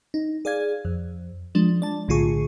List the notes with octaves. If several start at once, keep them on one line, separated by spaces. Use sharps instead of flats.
D#4
G#4 D5 F5 G#6
F2
F3 G#3 D4
D5 A5
B1 A2 D3 F4 G#4 C#6